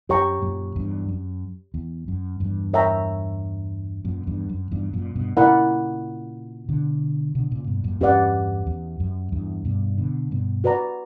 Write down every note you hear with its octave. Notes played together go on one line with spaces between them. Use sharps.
F#2 G4 C#5 G5 A#5 C#6
F#2 A#2
E2 G2
F#2
E2
F#2
E2 G2
A#4 C#5 E5 G5 A#5
F#2 A#2
E2 G2
F#2
E2 G2
F#2 A#2
G2 B2
A#2 C#3 E4 A#4 D5 F#5 B5
B2 D3
B2 D3
A#2 C#3
G2 B2
F#2 A#2
E2 G2 C#4 G4 B4 D5 F#5
E2
F#2
E2 G2
G2 B2
B2 D3
G2 B2
F#4 B4 D5 A#5